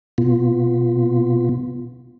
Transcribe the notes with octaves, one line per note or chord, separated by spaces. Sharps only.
B2 B3 F4